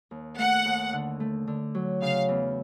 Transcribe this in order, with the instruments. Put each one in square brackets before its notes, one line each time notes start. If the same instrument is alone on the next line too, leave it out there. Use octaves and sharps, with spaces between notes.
[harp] D#2
[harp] A3 [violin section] F#5
[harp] D#2
D3
A3
D3
F#3
[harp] C#3 [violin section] F5
[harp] E2